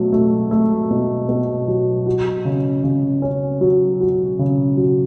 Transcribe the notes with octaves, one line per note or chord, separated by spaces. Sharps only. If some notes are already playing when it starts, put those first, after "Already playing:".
Already playing: B2 F#3 A3
A3
A3
B2
B2
F#3
F#4
C#3
C#3
C#4
F#3
F#4
C#3
F#3